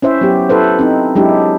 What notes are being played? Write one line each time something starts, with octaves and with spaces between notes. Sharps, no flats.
C#4 E4 C5 E5
F#3 B3 G4
E4 A4 B4 C5
C4 D#4
F#3 G#3 D4 E4 G4